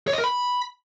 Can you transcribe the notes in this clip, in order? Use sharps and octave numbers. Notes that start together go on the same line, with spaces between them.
C#5
D#5
A#4
B5